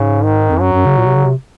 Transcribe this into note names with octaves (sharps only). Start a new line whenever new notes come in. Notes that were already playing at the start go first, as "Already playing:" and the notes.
Already playing: G#2 C#3
D#3
F2
F#2 F#3
F#2
C#3
A#2
C3
C#3
C3